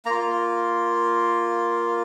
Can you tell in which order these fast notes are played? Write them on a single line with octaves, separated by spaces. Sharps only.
A#3 A#5 F4